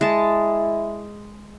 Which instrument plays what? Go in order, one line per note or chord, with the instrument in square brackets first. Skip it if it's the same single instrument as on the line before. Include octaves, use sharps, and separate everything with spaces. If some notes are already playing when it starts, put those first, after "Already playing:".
[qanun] G#3 A5 [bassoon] E4